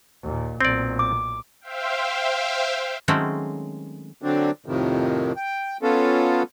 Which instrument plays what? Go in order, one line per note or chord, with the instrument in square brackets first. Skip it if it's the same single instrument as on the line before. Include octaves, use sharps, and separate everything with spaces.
[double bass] D#2 A#2
[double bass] B1 A#2 [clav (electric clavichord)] C4 D5
[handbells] D6
[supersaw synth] C5 E5 F5 G5
[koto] D#3 F#3 G#3 A3 C4 C#4
[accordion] D3 F#3 C4 D4
F2 A2 C3 D#3
G5
B3 C#4 F4 A4